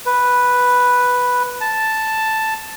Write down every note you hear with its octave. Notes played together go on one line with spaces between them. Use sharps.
B4
A5